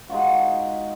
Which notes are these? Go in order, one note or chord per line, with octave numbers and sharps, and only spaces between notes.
G#3 D#4 F4 F#4